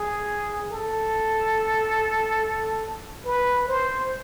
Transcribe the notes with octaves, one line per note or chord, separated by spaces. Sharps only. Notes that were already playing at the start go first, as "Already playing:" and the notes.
Already playing: G#4
A4
B4
C5